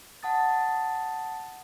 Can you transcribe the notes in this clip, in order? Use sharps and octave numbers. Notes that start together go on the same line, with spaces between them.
F#5 A5 D#6 A6